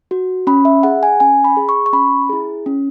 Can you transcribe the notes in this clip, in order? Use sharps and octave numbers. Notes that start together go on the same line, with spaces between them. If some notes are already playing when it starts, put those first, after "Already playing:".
F#4
C#4 B5
E5
G#4 F#5
G#5
C#4 G#5
B5
G#4
C#6
C#6
C#4 B5
E4 G#4
C#4